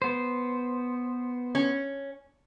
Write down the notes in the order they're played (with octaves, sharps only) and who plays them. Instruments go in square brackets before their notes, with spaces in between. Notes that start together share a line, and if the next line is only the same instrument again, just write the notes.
[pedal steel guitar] B3 C5
[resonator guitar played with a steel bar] C#4